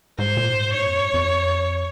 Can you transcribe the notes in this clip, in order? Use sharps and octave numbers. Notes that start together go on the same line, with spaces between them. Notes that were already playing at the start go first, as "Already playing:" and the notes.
G#2 C5
A#2
G#2
G2 C#5
F2
G2
F2